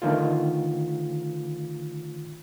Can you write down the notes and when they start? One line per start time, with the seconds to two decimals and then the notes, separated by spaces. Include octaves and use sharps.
0.02 D3 D#3 A3 F4